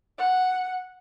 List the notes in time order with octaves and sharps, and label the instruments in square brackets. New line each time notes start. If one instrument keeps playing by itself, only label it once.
[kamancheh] F#5